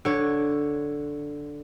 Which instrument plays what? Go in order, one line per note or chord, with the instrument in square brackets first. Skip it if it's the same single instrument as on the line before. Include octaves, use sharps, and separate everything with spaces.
[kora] D3 C#5